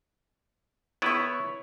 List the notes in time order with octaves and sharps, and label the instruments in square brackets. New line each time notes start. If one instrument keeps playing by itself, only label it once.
[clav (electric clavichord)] B3 E4 B4 [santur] C#5 B5 C#6